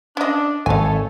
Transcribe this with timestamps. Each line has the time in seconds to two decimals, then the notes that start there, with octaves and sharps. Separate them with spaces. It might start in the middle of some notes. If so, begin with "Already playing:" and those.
0.17 C#4 D4 D#5
0.66 G#1 A3 A4 C#5 F5 G#5